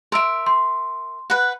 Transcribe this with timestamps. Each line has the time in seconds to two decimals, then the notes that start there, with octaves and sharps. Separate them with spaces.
0.12 A#4 E5 C6 E6 D7
0.46 C6
1.30 B4 F#5